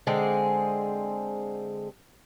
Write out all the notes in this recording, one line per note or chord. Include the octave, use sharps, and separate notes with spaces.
D3 G#3 C4 G#4